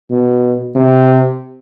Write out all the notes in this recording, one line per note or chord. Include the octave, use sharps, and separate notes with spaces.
B2
C3